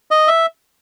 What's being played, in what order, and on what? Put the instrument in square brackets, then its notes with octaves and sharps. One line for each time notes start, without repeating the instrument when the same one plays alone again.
[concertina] D#5
E5